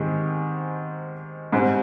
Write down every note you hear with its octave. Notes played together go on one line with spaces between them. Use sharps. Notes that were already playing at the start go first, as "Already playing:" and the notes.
Already playing: G#2 D#3 G#3 C4 G4
G#2 G3 C4